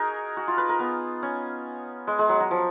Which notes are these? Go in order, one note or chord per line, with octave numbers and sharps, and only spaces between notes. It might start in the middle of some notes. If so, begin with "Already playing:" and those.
Already playing: D#4 F#4 G#4 A#4
F#4
F4
B4
A#4
B3
C#4
G#3
G#3
F#3
F#3
F3